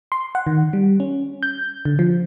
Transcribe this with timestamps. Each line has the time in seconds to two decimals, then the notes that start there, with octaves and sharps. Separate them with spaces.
0.12 C6
0.35 F#5
0.47 D#3
0.73 G3
1.00 C#4
1.43 G6
1.85 D3
1.99 F3